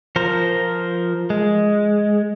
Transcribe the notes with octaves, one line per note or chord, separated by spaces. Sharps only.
F3 A#4 C5
G#3